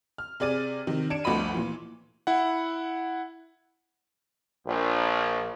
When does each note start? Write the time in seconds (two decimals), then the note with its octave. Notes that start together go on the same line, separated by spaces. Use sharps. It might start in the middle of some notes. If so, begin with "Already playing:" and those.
0.18 F6
0.40 C3 G#4 D5 A6 D#7
0.87 C3 D#3
1.10 D4 G#6 C#7 D7 E7
1.24 G1 D2 F3 D#5 B5 D#7
1.54 A#2 E3
2.27 E4 F#5
4.66 A#1